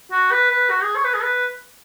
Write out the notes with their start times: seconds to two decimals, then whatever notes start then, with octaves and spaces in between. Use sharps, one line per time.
0.11 F#4
0.31 B4
0.50 B4
0.70 F#4
0.83 G#4
0.96 C#5
1.04 B4
1.14 G#4
1.22 B4